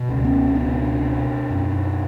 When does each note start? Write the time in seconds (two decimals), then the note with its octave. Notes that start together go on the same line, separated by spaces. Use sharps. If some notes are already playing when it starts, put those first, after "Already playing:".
Already playing: B2
0.09 C#2
0.24 B3 C#4
0.48 C#4
0.55 B2 C4 D4
1.03 B2
1.50 F#2